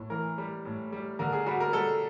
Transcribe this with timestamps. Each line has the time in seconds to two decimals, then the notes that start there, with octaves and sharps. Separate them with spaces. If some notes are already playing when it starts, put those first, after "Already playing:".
Already playing: A2
0.10 E3 A#4
0.38 G3
0.65 A2
0.92 G3
1.19 D3 A#4
1.32 G#4
1.46 G3 F#4
1.60 A#4
1.73 G3 A4